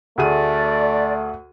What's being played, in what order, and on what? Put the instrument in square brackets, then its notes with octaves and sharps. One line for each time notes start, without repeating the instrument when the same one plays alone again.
[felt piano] D2 G#4 D#7 [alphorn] A3 [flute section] D5